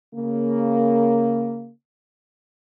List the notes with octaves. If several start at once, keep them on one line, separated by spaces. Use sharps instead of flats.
C#3 A#3